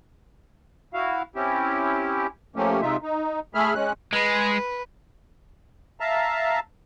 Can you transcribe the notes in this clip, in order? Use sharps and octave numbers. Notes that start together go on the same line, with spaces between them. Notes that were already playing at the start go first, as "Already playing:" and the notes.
E4 F#4 F5
C4 C#4 E4 G4
F3 A3 A#3 C#4 G4
C3 G#3 D#4 F4 E5
D#4
A3 G#4 E5 B5 F6
G#3 C#4 F#6
G#3 B4
E5 F5 A5 A#5